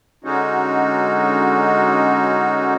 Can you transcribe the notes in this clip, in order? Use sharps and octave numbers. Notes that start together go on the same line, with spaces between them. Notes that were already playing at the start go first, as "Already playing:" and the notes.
D3 G#3 C#4 D#4 F#4